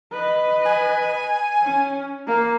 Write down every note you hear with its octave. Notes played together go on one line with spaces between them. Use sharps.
B4 D#5
G#5
C#4
A#3